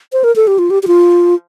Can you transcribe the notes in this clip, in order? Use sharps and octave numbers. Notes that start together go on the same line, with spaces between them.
C5
A#4
A4
G4
F4
G4
G4
F4